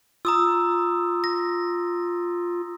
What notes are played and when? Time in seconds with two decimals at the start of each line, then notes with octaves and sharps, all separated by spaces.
0.25 F4 A#5 D#6 E6
1.24 A#6